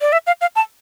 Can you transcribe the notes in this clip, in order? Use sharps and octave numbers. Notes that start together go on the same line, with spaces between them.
D5
E5
F5
F5
A5